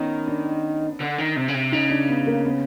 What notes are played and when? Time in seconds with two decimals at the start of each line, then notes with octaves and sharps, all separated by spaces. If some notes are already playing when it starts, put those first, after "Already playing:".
Already playing: D#3 B3 C#4
0.28 D4
1.00 D3
1.18 D#3
1.36 C3
1.48 C#3
1.54 C3
1.72 C#3 D#4
1.90 D4
2.09 B3
2.27 A#3
2.45 B3